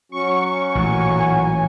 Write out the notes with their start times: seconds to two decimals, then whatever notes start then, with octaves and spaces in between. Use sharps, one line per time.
0.12 F#3 C#4 F#4 C#6
0.75 A1 A#2 G#5